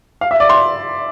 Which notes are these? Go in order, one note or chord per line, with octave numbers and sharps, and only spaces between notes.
F5
E5
D5
C6